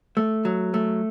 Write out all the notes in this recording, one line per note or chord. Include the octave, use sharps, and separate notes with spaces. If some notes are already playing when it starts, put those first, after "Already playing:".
A3
F#3
A3